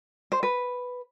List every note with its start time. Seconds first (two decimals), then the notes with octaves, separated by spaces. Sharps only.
0.32 C5
0.43 B4